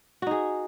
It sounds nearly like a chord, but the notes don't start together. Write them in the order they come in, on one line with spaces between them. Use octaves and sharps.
F#4 D#4 G#4